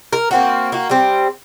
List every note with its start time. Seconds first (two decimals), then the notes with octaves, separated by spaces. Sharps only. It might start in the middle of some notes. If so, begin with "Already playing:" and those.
0.13 A#4
0.31 A#3 C4 F#4
0.72 A#3 F#4
0.90 G3 C4